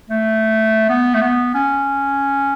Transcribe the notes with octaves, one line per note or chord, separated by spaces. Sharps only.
A3
B3
A3
B3
C#4